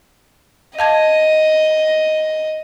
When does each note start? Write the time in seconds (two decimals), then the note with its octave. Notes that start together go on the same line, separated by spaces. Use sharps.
0.79 D#5 F5 A5 G#6